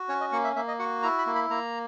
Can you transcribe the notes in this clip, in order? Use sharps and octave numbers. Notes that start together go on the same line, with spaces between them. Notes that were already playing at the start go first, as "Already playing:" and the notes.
Already playing: F#4
C#4 C#5
D#5
A#3 F#5
E5
A#3 E5
D#5
F#4 F#5
E4 A#5
B5
A#3
B5
A#3 A#5